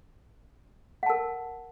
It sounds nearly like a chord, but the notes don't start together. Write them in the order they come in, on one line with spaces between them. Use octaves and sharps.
F#5 A5 A#4